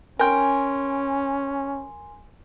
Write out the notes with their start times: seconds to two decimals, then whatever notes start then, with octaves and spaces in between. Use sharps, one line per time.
0.19 C#4 A#4 G5 G#5 C6